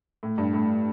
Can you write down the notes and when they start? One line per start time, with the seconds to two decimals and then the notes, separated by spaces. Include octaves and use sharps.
0.23 A2
0.38 G2
0.53 A2